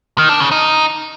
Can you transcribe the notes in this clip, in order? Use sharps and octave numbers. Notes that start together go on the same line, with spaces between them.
D#3
D4
C#3
D#4